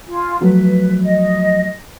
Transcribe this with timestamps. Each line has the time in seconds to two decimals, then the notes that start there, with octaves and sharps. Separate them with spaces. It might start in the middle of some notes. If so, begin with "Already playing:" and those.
0.06 F4 G#5
0.41 F3 F#3 A3 B4
1.01 D#5